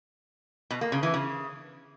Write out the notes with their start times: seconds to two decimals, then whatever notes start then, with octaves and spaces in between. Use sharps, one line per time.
0.71 B2
0.81 A#3
0.92 C#3
1.03 E3
1.14 C#3